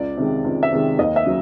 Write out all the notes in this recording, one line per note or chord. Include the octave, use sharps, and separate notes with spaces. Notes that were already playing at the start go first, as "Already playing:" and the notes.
Already playing: C#2 D5
C3 D#3 G#3
C#2
E5
C3 D#3 G#3
D#2 D#5
E5
C#3 F#3